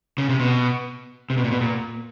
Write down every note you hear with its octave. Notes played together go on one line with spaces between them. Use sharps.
C#3
C3
B2
C3
B2
A#2
B2
A#2